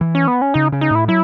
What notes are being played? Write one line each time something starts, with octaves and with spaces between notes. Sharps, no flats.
E3
C#4
B3
C#4
C#3 D#4
C#3
D#4
A2 E4
F#3 E4